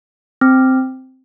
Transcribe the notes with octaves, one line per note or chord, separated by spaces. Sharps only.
C4